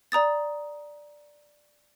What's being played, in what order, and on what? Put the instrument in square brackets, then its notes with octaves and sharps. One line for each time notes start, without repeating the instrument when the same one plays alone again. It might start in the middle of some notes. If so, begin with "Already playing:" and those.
[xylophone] D5 A#5 D#6 A6